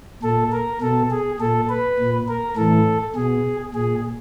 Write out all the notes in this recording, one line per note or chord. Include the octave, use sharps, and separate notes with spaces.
A#2 A4
A#4
B2 A4
G#4
A#2 A4
B4
A#2
A#4
A2 E3 A4
B2 G#4
A#2 G#4